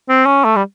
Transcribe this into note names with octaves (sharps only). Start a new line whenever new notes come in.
C4
C#4
A3
G3